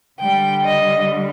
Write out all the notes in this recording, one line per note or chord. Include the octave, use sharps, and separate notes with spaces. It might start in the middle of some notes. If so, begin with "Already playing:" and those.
D3 G3 G5
D#5